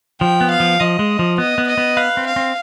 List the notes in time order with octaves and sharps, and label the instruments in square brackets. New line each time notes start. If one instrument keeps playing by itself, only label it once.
[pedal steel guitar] F3 [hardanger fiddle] G5
[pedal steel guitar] B3
[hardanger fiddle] F5
[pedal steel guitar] F3
[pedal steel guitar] F3 [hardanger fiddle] D#5
[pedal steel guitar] G#3
F3
[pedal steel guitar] B3 [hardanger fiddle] D#5
[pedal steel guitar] B3
[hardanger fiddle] D#5
[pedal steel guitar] B3
[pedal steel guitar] B4 [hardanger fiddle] F5
[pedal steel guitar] C4
[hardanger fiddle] F5
[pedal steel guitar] C4